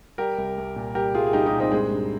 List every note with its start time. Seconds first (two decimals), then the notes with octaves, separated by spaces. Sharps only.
0.18 G3 G4 A#4
0.38 C2
0.58 C2
0.76 A#2
0.95 G3 G4 A#4
1.14 C2 F4 G#4
1.27 G#4
1.33 C2 D#4 G4
1.46 D#4 G4
1.53 A#2
1.60 C4 D#4
1.71 G2 G#3 C4
1.91 G2